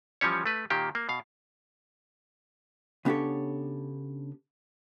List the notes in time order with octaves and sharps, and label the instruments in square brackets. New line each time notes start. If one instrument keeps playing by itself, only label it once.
[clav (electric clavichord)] E3 F3 G3 C#4 C#5
A3 B4
A#2 D#3 A#3 G4
A#3
B2 F5
[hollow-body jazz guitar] C#3 B3 D4 G4 A4 C#5